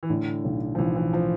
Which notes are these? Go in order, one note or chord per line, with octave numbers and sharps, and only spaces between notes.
E3
A2 D3
B1
F3
B1 E3
E3
F3